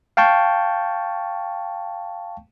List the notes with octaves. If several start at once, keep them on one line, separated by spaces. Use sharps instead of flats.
F5 G5 A5 C#6 G6